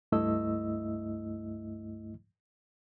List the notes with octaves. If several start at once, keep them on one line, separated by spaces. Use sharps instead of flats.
C#2 G2 A3 E4 D#5 E6